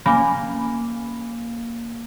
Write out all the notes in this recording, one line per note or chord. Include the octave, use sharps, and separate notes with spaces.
A#3 C#4 G#5 B5 D6